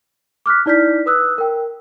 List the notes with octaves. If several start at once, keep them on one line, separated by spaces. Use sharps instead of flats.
D6 F6 F#6 B6
D#4 E4 D5 F6 G6 B6
B4 D#6 E6 F#6
A#4 G5